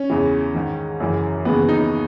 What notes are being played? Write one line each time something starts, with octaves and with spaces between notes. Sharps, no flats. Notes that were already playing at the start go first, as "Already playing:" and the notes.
Already playing: C#4
E2 C#3 E3
G#2 D#3
F#2 C#3 E3
D#2 C#3 E3 B3
D#4